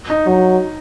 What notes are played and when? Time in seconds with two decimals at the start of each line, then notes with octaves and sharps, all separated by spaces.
0.10 D#4
0.26 F#3 D#4